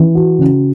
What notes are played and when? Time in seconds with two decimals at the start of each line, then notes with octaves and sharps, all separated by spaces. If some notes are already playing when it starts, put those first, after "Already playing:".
Already playing: E3
0.15 F#4
0.39 C#3